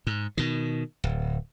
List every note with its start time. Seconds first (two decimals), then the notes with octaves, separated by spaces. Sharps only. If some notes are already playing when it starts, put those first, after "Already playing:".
0.07 G#2
0.37 B2 D#3
1.04 D1